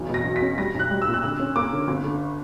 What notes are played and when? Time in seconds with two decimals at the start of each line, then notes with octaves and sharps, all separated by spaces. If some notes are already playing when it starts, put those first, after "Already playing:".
Already playing: B1 E2
0.09 B2
0.14 A#6
0.25 B1
0.36 B6
0.42 C#4
0.58 G3 A#6
0.74 B1
0.79 F#6
0.90 G3
1.02 E6
1.07 A#2
1.14 F#6
1.23 D3 E6
1.40 C#4
1.56 A#3 D6
1.72 D3
1.88 G1
2.04 D3